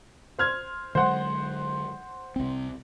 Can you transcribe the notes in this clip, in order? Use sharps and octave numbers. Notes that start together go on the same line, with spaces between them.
C5 F6 G#6
D3 F#3 G#3 C5 F#5
C2 C4